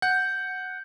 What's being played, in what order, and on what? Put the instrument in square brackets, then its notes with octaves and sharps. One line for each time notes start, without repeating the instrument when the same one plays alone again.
[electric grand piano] F#5 [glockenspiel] G6